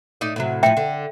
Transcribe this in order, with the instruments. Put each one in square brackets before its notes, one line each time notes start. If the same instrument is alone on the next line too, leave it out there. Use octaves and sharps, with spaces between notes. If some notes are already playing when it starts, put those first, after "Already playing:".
[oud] A2 D#4 D5
A2 C3 F#3
[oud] A2 D#3 F3 [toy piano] E5 G5
[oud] D3